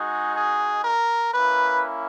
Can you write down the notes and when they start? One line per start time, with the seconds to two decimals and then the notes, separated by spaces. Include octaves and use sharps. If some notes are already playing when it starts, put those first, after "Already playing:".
Already playing: G#3 D#4 F#4 G#4
0.37 G#4
0.85 A#4
1.33 A#3 C#4 E4 B4